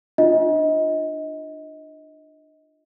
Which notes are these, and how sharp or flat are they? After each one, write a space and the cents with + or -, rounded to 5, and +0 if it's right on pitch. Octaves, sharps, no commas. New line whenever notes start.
D4 +30 F4 +0 D#5 +25